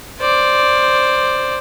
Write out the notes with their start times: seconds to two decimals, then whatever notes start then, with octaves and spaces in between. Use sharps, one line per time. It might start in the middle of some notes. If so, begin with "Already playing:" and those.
0.20 C5 D5